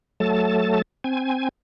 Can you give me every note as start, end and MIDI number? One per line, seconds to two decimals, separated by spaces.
0.20 0.82 54
0.20 0.82 57
0.20 0.82 69
0.20 0.82 81
1.04 1.49 60
1.04 1.49 80